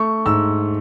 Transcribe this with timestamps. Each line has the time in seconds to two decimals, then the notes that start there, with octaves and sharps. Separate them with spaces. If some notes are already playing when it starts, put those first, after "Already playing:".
Already playing: A3 C#6
0.26 G#2 E6